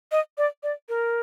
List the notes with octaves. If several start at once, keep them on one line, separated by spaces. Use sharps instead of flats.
D#5
D5
D5
A#4